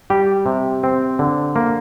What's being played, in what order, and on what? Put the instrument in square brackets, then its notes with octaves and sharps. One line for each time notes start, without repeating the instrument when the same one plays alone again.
[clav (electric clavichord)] G3 G4
C3
C4
D3
A#3